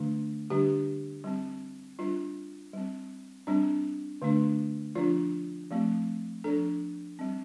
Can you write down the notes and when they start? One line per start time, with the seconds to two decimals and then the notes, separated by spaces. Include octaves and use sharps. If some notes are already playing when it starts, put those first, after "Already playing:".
Already playing: D3 A3 D4
0.50 D3 G3 D4 G4
1.24 G3 C4
1.99 G3 D4 F4
2.73 G3 C4
3.47 G3 C4 D4
4.22 D3 A3 D4
4.95 F3 D4 F4
5.71 F3 A3 C4
6.44 F3 D4 A4
7.19 G3 C4